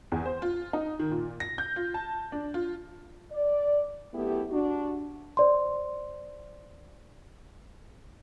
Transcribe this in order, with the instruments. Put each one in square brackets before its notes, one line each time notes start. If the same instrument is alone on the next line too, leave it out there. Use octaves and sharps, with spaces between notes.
[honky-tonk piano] E2
C5
F4
D#4
D#3
A#2
A#6
G6
F4
A5
D4
F4
[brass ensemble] D5
F#2 A3 B3 E4 G4
D4 F#4
[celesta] C5 D5 C6